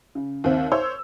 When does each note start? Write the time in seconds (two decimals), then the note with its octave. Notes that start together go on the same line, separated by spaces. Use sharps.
0.15 C#3
0.44 D#2 C4 E5
0.72 C5 C#5 E6